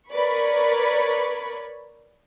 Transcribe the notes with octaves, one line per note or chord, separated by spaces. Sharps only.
A#4 B4 C#5 D5 B5 C#6